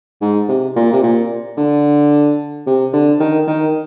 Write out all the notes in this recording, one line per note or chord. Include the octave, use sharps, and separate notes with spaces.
G#2
C3
A#2
C3
A#2
D3
C3
D3
D#3
D#3